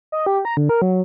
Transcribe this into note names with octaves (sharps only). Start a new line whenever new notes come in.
D#5
G4
A#5
D3
A#4
F#3